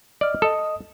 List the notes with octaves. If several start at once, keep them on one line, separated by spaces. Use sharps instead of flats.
D5 D#5 F6
A4 D#5 D#6